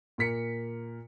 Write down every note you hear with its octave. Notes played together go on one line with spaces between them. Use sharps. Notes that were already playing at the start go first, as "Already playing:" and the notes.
A#2 A#4 B6 C#7